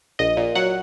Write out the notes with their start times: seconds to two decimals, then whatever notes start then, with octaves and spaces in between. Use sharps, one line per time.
0.19 A#1 D#5
0.37 A#2
0.55 F#3 F#5